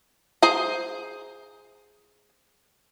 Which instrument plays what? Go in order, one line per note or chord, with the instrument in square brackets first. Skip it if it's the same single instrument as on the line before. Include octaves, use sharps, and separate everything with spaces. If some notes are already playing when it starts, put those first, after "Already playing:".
[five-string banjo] G#4 C5 A#5